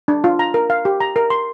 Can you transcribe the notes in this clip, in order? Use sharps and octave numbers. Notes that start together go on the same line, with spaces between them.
D4
F4
A#5
A#4
F5
G4
A#5
A#4
C6